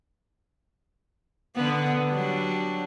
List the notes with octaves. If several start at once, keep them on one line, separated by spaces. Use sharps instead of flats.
D3 B3
F#3 G3 D4